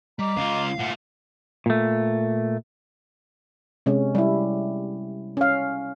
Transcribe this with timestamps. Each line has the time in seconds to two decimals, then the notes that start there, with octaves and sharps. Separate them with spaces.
0.19 G3 D#5 A#5 D6
0.37 C#2 F4 F5
0.79 A#2 A3 F#5
1.66 A#2 A3
3.86 C3 G#3 C#4
4.15 G3 E4
5.37 C#4 F5